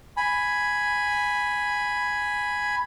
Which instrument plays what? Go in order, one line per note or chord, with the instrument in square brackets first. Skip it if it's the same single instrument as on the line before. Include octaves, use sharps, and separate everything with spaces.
[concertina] G#5 B5